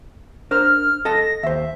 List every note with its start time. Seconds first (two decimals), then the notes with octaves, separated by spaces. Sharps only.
0.51 D4 A#4 C5 F6
1.05 A4 D#5 A5 A#6
1.43 D#2 C5 E5